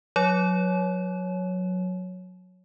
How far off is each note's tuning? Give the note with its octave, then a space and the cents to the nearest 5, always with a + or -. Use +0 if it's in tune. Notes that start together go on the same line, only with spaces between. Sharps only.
F#3 -20 C#5 +0